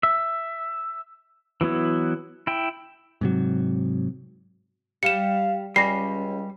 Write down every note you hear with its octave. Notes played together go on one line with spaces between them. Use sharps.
E5
E3 F#3 B3 E4
E4 G5
G#2 C3 F#3
G3 F5 C#7 E7
C#2 G3 C#4 A#6 C7